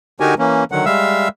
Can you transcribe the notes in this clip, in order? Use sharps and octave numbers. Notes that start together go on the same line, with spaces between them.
D3 D#4 F#4 G4 A#4 G#5
E3 A#3 C#4
D3 D#3 F#3 F#5
G3 G#3 E5 F5 E6